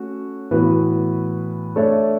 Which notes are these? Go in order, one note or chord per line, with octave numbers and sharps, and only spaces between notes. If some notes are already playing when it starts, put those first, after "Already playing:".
Already playing: A3 C#4 F#4
A2 E3 B3 F#4 B4
A3 D4 A4 C#5 E5